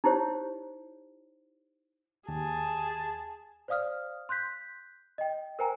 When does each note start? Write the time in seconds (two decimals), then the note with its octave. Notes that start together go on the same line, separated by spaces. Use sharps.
0.04 D#4 E4 G4 C5 C#5
2.28 D#2 G4 G#4 A5
3.68 C5 D5 F5 D#6 F6
4.29 C6 F#6 G6 B6
5.18 D#5 G5
5.59 A#4 C5 G5 G#5 A#5